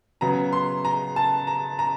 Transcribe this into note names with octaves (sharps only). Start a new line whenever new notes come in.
C#3 F#3 B3 A#5
C6
A#5
A5
A#5
A#5